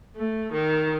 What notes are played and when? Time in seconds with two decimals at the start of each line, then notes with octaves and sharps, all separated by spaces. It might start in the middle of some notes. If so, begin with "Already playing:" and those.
0.16 A3
0.53 D#3